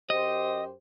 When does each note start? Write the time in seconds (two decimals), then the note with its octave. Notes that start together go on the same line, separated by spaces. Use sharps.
0.10 F#2 G4 C5 D#5